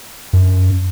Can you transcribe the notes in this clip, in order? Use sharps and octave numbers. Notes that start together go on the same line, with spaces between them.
F#2